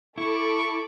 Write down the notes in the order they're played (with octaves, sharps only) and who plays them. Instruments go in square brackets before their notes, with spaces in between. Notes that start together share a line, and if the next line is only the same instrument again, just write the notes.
[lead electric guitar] E4 [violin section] A4 B5 D6 [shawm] C#6